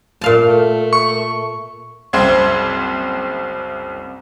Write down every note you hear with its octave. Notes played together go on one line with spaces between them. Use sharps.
A#2 F5 A5
A3
C#6
F#1 C2 C4 C6 G#6